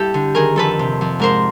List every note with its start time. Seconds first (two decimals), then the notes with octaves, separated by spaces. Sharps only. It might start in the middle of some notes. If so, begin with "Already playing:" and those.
Already playing: G2 E4 G4 A4
0.14 D3
0.35 D#3 G#4 A#4
0.56 F2 A4 B4
0.79 C3
1.01 F2
1.19 G#2 A#4 C5